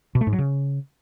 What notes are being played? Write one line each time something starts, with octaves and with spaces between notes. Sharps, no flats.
B2
A3
G#2
F#3
C#3